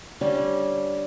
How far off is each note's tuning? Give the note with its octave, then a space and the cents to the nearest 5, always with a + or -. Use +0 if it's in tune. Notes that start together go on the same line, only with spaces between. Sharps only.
D3 -10 G3 -10 C#4 -10